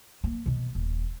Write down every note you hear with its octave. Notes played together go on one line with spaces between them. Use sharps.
A#3
B2 D#3
D#1